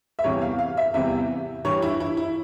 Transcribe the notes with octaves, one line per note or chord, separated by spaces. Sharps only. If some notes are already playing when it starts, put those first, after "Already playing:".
E5
E2 C3 E3 G3 C#5
F5
F5
E5
E2 C3 E3 G3 E5
G2 E3 G3 C#5
E4
E4
E4